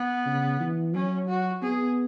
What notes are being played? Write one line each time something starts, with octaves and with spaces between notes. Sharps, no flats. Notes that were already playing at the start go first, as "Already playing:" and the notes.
Already playing: B3
C#3
E3
F#3 C#4
F#4
B3 G#4